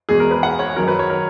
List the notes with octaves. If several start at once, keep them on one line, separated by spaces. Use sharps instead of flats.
E2 B2 G#3 G#4
A#4
B4
F#5
C#5
F#2 D#3 F#3 A#4
B4
C#5
A#4